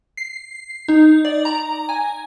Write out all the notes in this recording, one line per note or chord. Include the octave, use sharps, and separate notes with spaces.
C7
D#4
D5
A#5
G#5